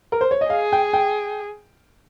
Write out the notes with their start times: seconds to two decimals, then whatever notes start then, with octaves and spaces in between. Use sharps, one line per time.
0.12 A#4
0.21 C5
0.31 C#5
0.41 D#5
0.50 G#4 F5
0.72 G5
0.93 G5